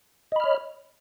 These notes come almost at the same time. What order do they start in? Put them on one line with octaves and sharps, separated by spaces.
D#5 B5 F6 C#5